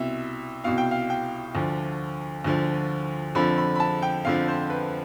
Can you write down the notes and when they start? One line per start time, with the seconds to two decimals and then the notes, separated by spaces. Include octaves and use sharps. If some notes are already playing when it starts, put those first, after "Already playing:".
Already playing: C2 B2 E5
0.64 C2 B2 F5
0.78 G5
0.91 F5
1.10 G5
1.55 D2 D3 F3
2.44 D2 D3 F3
3.35 F2 D3 F3 B5
3.58 B5
3.76 B5
3.80 A5
4.03 G5
4.25 F2 D3 F3 F5
4.48 C5
4.70 B4